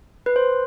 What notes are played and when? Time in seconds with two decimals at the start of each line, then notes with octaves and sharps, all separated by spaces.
0.26 B4
0.36 C5